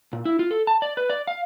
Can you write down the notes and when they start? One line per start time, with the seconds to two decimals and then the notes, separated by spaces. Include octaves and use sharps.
0.13 A#2
0.25 E4
0.39 F4
0.51 A4
0.67 A5
0.82 D5
0.97 B4
1.10 D5
1.27 F5